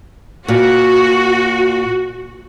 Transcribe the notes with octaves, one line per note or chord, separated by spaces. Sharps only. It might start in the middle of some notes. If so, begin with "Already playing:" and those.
A#2 F#4